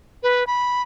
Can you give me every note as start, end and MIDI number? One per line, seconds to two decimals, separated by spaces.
0.23 0.44 71
0.47 0.82 83